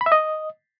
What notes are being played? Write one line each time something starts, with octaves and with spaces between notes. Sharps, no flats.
B5
E5
D#5